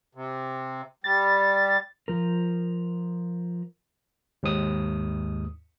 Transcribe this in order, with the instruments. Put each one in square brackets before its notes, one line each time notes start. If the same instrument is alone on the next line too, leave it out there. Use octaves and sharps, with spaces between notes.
[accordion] C3
[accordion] G3 [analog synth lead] A6
[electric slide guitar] F3 A#4
[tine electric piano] D#2 G#2 D#6